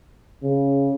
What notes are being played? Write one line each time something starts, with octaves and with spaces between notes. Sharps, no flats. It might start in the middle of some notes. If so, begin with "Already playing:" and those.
C#3